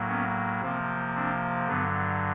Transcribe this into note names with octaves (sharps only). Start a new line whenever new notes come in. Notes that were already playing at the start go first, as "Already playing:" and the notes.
Already playing: A2 F#3 A#3
B3 C#4
C3 F3 A#3 C4
C4 D4
G2 D3 F#3 B3